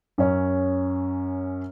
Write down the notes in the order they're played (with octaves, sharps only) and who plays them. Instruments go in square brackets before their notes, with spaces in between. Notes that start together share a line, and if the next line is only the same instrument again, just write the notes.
[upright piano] F#2 C#4